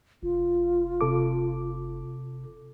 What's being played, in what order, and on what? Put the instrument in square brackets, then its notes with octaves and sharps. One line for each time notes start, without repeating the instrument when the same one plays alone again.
[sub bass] F1 [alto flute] F4
[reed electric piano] C3 A4 D6